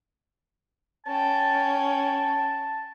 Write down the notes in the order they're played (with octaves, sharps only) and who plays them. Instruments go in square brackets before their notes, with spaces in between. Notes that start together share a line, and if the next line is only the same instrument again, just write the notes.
[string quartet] C#4 G5 [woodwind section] A5